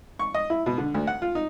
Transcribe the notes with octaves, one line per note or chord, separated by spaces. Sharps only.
C#6
D#5
E4
B2
D3
D2
F#5
F4
D#4